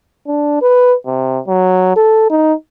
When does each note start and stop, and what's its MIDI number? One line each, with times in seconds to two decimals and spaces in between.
0.27 0.60 62
0.62 0.95 71
1.06 1.39 48
1.48 1.95 54
1.96 2.27 69
2.30 2.53 63